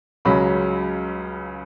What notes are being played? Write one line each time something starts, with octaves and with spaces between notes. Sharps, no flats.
C#2 C#3 F#3 B5